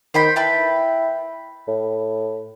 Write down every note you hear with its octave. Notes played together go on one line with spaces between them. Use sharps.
D#3 C5 G5 B5
E4 B4 G5 A5
A2